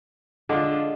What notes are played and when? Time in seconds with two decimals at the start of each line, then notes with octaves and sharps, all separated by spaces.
0.49 D3 G#3 D4 F4